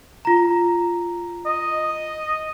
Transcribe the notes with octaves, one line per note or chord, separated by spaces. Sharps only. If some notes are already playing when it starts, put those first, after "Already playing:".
F4 A#5
D#5